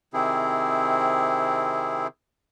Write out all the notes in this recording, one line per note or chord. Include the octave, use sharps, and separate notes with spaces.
C3 D#3 C4 E4 G#4